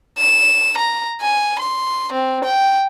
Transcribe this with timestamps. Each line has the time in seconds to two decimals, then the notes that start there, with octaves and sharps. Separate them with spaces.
0.18 E7
0.77 A#5
1.21 G#5
1.59 C6
2.13 C4
2.44 G5